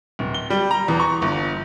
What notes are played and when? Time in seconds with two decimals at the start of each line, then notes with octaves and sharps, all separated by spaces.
0.19 D1
0.34 G7
0.50 G3
0.71 A#5
0.88 E2
1.00 C#6
1.22 G1